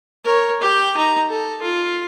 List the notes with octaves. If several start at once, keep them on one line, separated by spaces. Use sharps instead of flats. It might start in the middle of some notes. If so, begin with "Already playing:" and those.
A#4 C#5
G4 G5
D#4 A#5
A4
F4